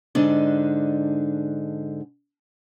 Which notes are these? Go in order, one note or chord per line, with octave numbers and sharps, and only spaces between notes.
G#2 D3 D4 D#4